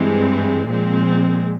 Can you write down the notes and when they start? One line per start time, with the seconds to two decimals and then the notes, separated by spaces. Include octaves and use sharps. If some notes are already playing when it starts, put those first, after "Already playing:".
Already playing: G2 E3 G#3 C4
0.67 A#2 F3 G#3 C4